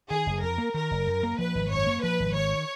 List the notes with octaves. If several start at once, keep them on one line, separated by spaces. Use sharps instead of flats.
D#3 G#4
F#1
F2 A#4
A#3
D#3 A#4
F#1
F#2
A#3
F3 B4
G#1
F#2 C#5
A#3
F3 B4
G#1
D#3 C#5